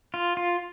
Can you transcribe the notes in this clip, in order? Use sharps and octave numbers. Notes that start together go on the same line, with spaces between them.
F4
F4